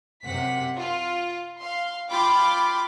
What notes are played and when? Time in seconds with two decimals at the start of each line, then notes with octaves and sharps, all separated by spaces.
0.24 F#2 C3 F#5 B6
0.77 F4
1.59 F5 C6
2.09 F4 G5 B5 C6 D6